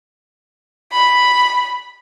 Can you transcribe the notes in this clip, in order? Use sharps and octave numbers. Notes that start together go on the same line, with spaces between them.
B5